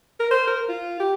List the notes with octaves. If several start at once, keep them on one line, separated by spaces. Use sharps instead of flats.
A#4
C5
A#4
F4
G4